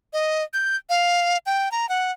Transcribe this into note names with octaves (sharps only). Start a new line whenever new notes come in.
D#5
G6
F5
G5
A#5
F#5